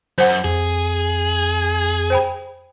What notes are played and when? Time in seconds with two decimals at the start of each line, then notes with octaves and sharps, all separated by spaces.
0.18 F#2 C5 F#5
0.44 F2 G#4
2.10 C5 G5 B5